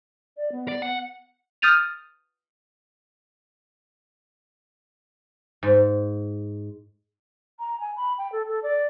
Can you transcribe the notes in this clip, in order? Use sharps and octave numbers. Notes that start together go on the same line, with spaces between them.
D5
B3
D5
B3 F#5
D#6 F6 G6 A6 D#7 F7
G#2
A#5
G#5
B5
G5
A4
A4
D5